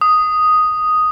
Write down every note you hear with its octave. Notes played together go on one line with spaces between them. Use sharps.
D#6